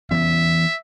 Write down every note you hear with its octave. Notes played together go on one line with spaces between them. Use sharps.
E3 B3 C#4 E5